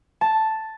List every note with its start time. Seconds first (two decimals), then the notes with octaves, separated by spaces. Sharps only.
0.21 A5